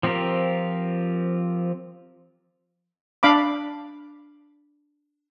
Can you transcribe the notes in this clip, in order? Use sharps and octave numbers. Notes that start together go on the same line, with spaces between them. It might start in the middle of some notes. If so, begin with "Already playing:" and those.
F3 C4 F4 G4 A#4
D4 F5 B5 D6